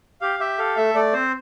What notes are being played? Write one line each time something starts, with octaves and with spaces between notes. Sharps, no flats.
G4 F5
G4 E5
A4 F5
A3 E5
A3 D5
C4 C5